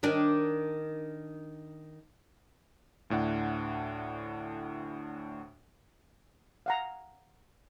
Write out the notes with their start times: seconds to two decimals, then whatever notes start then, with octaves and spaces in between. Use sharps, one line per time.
0.03 D#3 D4
3.10 D2 A2 D4 F#5
6.66 F5 F#5 A#5